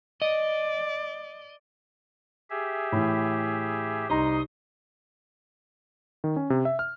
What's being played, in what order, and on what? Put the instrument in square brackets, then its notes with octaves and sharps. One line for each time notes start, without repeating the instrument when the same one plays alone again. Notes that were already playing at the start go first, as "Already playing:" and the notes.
[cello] D5 [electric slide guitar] D#5
[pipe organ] G4 G#4 E5
[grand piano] A2 E3
[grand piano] C2 D#4 A#5 [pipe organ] C6 D#6
[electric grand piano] D#3
C#4
C3
E5
F6